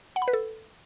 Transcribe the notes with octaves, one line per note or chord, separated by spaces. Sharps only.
F#5
B5
B4
A4